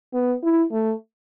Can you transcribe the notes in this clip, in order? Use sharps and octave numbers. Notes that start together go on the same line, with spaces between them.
B3
E4
A3